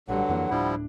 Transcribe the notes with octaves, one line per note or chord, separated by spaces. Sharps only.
A1 G2 D3 F#3 G3 F#5
F2 E3 A#3
D1 A2 F3 G3 D4 E4